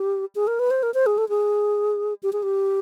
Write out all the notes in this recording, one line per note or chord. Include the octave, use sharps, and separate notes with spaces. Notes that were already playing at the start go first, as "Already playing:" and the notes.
Already playing: G4
G#4
A#4
B4
C5
A#4
C5
G#4
A4
G#4
G4
G#4
G4